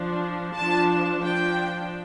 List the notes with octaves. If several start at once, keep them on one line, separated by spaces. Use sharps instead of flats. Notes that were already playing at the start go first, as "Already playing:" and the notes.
Already playing: F3 D4
F3 D4 A5
F3 D4 G5